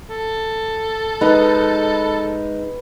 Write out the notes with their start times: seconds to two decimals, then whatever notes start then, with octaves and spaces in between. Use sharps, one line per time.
0.10 A4
1.21 G#3 D#4 B4